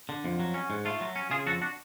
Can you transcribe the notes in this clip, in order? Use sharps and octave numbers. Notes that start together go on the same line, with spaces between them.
D3
F2
F#3
C#4
G#2
A3 F4
F#3
C#4
C#3 F4 G#4
F2 F#4 A4
D4 F#4